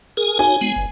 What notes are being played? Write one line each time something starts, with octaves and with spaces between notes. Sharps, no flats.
G#4 A#4 G#5
D#4 F#4 C#5 G#5
G#3 B3
G1